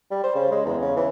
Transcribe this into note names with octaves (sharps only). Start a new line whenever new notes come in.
G3
C5
C#3
G#3
E2
C#3
E3